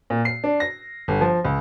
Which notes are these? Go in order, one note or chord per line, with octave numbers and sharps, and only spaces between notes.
A#2
C7
D4
A#6
G1
F3
C#2